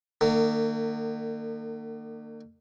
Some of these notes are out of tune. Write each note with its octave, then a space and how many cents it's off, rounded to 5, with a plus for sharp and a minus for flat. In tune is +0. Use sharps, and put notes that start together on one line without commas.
D3 +45 A#3 -35